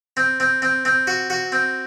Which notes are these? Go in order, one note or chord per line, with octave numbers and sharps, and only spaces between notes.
C4
C4
C4
C4
F#4
F#4
C4